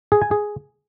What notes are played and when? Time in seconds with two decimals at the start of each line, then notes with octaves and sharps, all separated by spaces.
0.12 G#4
0.22 G#5
0.31 G#4